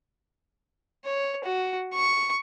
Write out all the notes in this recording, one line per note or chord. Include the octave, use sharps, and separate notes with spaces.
C#5
F#4
C#6